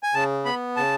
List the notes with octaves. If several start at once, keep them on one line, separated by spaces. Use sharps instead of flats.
G#5
C#3 A5
B3 B5
C#3 A5